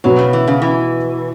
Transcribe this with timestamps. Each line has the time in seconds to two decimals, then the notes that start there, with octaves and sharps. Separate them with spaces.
0.04 B2 F#3 B3 F#4 C#5
0.19 C#3
0.33 E3
0.47 C#3
0.62 E3